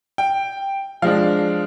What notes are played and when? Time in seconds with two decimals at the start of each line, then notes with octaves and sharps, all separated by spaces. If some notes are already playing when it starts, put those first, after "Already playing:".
0.18 G5
1.02 F3 G#3 D4 F5